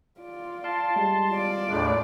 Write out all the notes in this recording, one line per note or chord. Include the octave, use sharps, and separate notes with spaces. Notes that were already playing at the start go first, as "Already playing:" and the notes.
F4 D5
F5 A5 C6
G3 G#3
F4 D5
D#2 A2 G#3 A3 D4